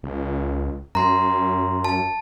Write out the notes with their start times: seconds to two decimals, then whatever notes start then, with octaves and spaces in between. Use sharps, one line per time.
0.03 C#2
0.95 F#2 A#5 C6
1.84 A5